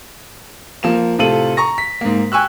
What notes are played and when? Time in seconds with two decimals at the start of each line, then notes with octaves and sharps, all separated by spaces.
0.83 F3 A#3 E7
1.19 A2 C3 F4 A4 D#7 F#7
1.57 A#5 C#6 A#6
1.78 B6
2.01 G#2 A#3
2.32 G5 G#5 C#6 E6 F#6